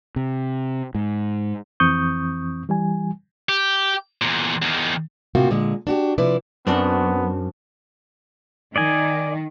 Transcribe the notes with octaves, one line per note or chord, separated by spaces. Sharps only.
C3
G#2
F2 E3 C4 C#6 D#6 G6
E3 G3 G#5
G4
E2 A#2
E2 D#3
A2 C3 A#3 C4 F4 F#4
A#2 D3 G#3
D4 F#4 G4
C3 F3 E4 B4 D5
F#2 B3 C4 D4 F#4
D#3 D5 D#5 G#5